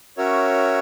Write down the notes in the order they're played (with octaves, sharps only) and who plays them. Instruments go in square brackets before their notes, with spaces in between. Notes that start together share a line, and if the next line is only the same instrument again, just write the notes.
[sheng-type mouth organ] C#4 F#4 A#4 C#5 E5